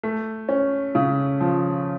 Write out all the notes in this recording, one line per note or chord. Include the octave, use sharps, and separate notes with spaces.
A3
C#4
C#3
F3